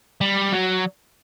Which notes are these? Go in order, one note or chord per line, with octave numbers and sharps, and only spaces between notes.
G3
F#3